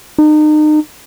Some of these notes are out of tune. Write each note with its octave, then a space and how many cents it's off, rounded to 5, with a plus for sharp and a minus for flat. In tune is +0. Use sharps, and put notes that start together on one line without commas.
D#4 -35